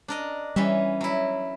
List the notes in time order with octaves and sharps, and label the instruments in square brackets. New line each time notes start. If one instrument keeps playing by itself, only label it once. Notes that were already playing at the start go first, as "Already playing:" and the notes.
[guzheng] D4 A#4 D#5
[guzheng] E3 C#4 E5 [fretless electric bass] G3
[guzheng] F#3 E4